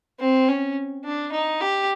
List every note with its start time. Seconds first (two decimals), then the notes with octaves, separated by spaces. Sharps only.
0.20 C4
0.48 C#4
1.04 D4
1.32 D#4
1.61 G4